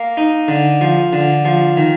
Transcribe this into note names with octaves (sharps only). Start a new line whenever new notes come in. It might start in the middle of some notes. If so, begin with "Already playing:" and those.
Already playing: A#3
D#4
D3
F3
D3
F3
D#3